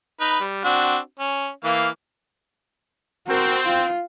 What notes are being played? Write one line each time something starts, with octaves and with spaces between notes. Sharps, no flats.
D#4 B4
G3
C4 D4 F#4
C#4
E3 A#3 F5
C4 F#4 A#4
F4